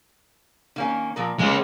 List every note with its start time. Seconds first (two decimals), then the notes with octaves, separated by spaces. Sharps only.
0.76 D#3 A#3 C#4
1.16 A#2 F3 A#4
1.39 G#3 A#3 C#4